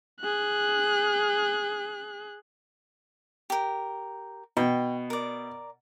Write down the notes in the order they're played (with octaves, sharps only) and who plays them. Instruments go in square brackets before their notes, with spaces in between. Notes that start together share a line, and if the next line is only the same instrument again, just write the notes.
[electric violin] G#4 F#6
[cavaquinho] G4 A#4
[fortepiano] B2 [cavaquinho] G5
[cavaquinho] A#4 D5